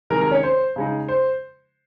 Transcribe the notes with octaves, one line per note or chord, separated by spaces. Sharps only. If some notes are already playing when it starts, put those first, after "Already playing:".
C3 D#3 G#3 A#4
A#4
C#4 C#5
C5
C#3 G#3 D#4
C5